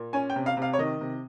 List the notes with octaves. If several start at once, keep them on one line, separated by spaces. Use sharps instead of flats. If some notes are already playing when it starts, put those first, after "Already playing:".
Already playing: A#2
C#4 G#5
G5
C3
F5
C3
F5
C#5
D#3 D#5
C3